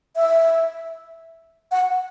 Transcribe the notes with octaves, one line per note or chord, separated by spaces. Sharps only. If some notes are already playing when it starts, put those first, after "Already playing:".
E5
F#5